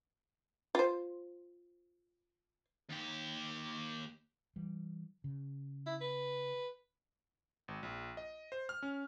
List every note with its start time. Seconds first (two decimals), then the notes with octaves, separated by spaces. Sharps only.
0.75 F4 C5
2.90 D#2 G4
4.56 E3 G3
5.24 C#3
5.86 E4
6.01 B4
7.68 G#1
7.83 A#1
8.17 D#5
8.52 C5
8.69 F6
8.83 C#4